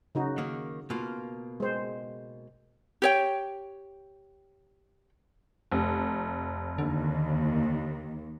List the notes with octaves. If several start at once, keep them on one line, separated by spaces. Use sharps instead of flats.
C#3 D#4 F#4
D#3 A#3
B2 A#3 F4
G#3 C5
G4 C#5 G5
F1
D#2 D3